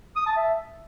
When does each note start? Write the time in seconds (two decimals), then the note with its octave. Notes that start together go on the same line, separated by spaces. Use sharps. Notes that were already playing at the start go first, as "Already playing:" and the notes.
0.16 D#6
0.26 A5
0.36 E5